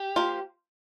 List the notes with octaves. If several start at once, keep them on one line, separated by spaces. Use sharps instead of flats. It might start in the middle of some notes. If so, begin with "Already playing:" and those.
Already playing: G4
F3 A#3 F4 C5